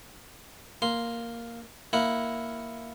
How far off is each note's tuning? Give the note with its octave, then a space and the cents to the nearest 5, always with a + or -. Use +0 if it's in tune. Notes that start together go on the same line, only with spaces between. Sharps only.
A#3 +0 C6 +0
A#3 +0 E4 +0 F#5 +0